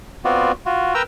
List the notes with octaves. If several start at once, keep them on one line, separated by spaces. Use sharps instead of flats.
B3 C4 F4 F#4 D5
F4 F#4
A#4 B4 G5 A#5 E6